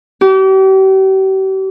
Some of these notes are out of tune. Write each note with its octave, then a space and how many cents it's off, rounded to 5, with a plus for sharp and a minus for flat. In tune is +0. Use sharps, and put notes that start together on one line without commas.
G4 -40